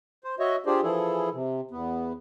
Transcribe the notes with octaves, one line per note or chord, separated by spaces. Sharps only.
C5
F#4 C#5 D#5 E5
D4 F4 G4 G#4 C5 D5
E3 F3 E4 G#4 A4
C3
E2 B3